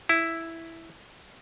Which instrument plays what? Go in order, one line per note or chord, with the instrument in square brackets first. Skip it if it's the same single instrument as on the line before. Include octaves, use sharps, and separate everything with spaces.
[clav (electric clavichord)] E4